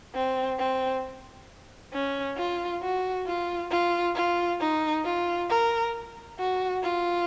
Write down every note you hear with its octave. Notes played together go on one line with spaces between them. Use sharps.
C4
C4
C#4
F4
F#4
F4
F4
F4
D#4
F4
A#4
F#4
F4